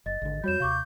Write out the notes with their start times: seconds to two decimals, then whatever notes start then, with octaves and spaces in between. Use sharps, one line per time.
0.06 F#1 D#5 A6
0.22 G#1 D3
0.44 F2 G3 F#4 C#5 G6 E7
0.60 D#2 C3 F5 C#6 D6